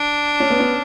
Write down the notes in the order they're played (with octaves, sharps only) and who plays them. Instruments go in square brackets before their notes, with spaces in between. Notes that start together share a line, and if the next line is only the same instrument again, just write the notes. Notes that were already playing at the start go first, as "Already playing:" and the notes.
Already playing: [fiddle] D4
[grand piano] C#4
B3
C#4